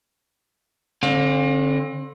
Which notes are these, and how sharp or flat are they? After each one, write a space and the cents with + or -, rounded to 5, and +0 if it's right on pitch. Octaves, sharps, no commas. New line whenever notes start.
D3 -10 C4 +40 F5 +35